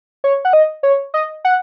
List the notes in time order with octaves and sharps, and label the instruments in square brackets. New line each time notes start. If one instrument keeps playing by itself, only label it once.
[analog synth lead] C#5
F#5
D#5
C#5
D#5
F#5